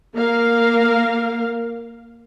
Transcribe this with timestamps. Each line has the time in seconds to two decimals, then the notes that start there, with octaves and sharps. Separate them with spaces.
0.15 A#3 A#4 F5